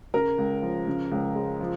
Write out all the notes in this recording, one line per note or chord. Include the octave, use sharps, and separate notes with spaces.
C#3 A#4
C#2
F3
C#3
C#2
G#3
F3